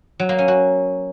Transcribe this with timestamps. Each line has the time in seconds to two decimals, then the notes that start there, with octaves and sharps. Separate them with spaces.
0.20 F#3
0.29 A#3
0.38 C#4
0.48 F#4